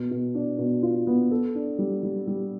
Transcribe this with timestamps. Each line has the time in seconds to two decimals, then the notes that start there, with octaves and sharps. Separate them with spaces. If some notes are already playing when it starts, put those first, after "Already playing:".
Already playing: B2
0.11 B2
0.35 D4
0.59 B2
0.83 F4
1.07 B3
1.31 A4
1.55 D4
1.79 G3
2.03 G3
2.27 G3